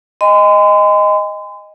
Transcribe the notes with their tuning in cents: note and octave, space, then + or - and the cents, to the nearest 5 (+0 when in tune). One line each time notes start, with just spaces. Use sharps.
D#5 +0 G#5 -40 C6 -40